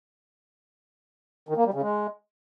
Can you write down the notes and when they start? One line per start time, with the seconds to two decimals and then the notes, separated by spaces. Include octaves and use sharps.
1.49 D#3
1.57 A#3
1.65 G3
1.74 C#3
1.82 G#3